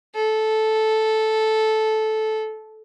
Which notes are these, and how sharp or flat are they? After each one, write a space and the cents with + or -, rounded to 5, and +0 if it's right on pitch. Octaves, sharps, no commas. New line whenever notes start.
A4 -10